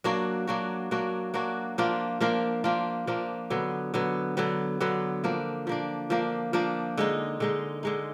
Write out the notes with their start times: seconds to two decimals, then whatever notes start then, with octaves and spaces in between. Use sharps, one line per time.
0.04 F#3 A#3 D4 F#4
0.47 F#3 A#3 D4 F#4
0.91 F#3 A#3 D4 F#4
1.34 F#3 A#3 D4 F#4
1.78 F3 A#3 D4 F4
2.20 F3 A#3 D4 F4
2.64 F3 A#3 D4 F4
3.07 F3 A#3 D4 F4
3.50 D3 F#3 B3
3.94 D3 F#3 B3
4.37 D3 F#3 B3
4.80 D3 F#3 B3
5.24 F3 A#3 D4
5.67 F3 A#3 D4
6.10 F3 A#3 D4
6.53 F3 A#3 D4
6.97 D3 G#3 D#4
7.40 D3 G#3 D#4
7.83 D3 G#3 D#4